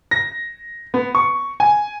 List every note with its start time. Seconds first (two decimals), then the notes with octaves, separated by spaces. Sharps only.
0.11 A#6
0.94 B3
1.15 C#6
1.60 G#5